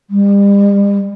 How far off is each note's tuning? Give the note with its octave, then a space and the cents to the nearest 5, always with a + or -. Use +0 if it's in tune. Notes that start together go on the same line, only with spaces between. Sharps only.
G3 +40